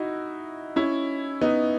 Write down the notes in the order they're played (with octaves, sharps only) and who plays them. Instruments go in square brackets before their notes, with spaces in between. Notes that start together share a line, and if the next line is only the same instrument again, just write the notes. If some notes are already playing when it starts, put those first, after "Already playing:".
Already playing: [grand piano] D#4 E4 F#4
C#4 E4
B3 D#4